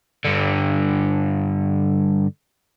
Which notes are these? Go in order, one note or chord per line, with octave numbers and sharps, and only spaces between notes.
G2 D3